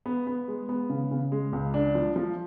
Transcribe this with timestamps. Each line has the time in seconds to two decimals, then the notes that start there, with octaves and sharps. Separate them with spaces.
0.06 B3
0.27 B3
0.48 G#3
0.69 B3
0.90 C#3
1.11 C#3
1.32 G#3
1.53 C#2
1.74 D4
1.95 F3
2.16 F3